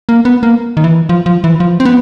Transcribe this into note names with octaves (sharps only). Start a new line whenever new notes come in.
A#3
B3
A#3
D#3
E3
F3
F3
E3
F3
C4
B3